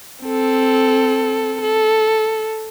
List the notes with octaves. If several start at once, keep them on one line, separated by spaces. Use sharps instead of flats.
C4 A4
A4